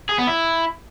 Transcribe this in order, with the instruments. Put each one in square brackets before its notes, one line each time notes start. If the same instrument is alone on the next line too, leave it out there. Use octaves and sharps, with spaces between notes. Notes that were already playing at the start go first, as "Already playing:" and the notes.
[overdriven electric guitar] G#4
B3
E4